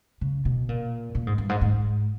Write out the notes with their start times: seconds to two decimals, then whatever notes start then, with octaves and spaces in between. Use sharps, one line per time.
0.21 C#3
0.45 B2
0.69 A#2
1.15 A#2
1.27 G#2
1.38 G2
1.49 G#2
1.61 G#2